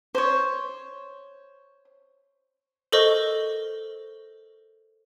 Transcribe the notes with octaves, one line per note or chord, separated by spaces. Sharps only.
C5 C#5
A4 A#4 C5 D#5 C#6